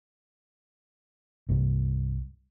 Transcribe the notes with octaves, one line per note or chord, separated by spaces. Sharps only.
C2 G2